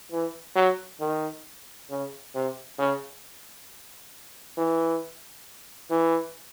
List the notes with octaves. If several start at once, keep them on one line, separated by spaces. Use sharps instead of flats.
E3
F#3
D#3
C#3
C3
C#3
E3
E3